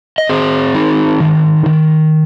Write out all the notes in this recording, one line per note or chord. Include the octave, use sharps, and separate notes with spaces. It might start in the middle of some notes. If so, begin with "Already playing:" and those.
D#5
C4 G#4 C5
D#4
D#3
D#3